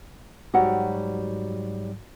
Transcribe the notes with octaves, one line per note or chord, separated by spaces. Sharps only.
G#2 F#3 G3 F#4 F#5